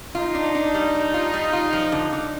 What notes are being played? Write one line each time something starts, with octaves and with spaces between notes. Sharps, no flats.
D#4 F4
D4
D4
G3
G3
F4
G3
F4
F3
D3
D3